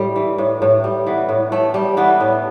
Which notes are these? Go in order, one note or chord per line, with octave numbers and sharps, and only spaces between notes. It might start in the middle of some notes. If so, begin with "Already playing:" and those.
Already playing: A2 G3
E3
A2
A2
G3
E3 B3
A2
A2 A3
G3
E3 B3
A2